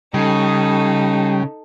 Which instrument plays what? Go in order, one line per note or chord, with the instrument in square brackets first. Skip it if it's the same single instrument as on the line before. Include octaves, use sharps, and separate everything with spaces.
[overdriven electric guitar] C#3 [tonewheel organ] G3 G5 [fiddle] D#4 A4